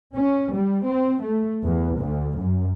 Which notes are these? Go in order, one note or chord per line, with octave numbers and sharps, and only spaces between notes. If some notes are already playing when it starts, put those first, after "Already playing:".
C#4
G3
C4
A3
E2
D2
F#2